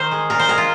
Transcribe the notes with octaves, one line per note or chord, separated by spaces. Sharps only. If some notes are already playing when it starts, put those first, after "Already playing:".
Already playing: D#3 A#4 C5
G#3
A#2 A#4
C5
G#3 A#4
F4